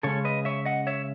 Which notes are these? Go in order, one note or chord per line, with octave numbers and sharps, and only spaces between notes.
C#3 G#3 C#4 A4 C#5
B4 D#5
C#5 E5
D#5 F#5
C#5 E5